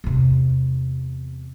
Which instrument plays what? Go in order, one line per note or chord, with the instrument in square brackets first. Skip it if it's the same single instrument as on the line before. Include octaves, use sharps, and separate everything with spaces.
[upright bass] E2 C3